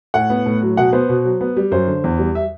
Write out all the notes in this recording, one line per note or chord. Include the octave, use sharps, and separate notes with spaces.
A2 F#5
B3
A2
F#3
B2 F#5
B3 C5
B2
F#3
B3
G3
F#2 C5
D3
E2
G3
E5